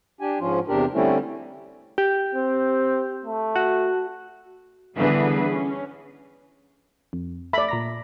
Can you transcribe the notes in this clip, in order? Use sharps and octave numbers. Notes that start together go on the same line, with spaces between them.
D4 G4 G#5
G#2 F3 C#4 F4
E2 C3 D4 G4 A#4
D3 G3 A3 C4 C#4 E4
G4
C4
A3
F#4
D3 E3 G3 B3 G#4 B4
C#4
F2
A3 D5 E5 B5
A#2 A#5 A#6